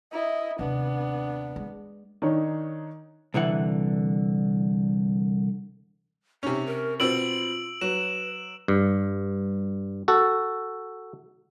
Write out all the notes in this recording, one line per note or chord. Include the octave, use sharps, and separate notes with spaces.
E4 D#5
D#2 C3 B3 D4
G#3
D#3 D4 D#4 C#5
C2 D3 E3 F#5
C3 C#4 D#4
A#4
B2 C4 F4 E6 D7 F#7
F#3 B4 E7
G2
F#4 A4